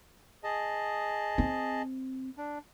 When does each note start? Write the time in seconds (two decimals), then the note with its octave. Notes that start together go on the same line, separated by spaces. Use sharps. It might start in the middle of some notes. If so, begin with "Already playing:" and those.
0.44 G#4 D#5 A5
1.38 C4
2.38 D4